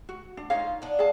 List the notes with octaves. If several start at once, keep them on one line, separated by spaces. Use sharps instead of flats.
F#4
D4
D#4 F4 C#5 F5
B3 D4
G#4 F5 A5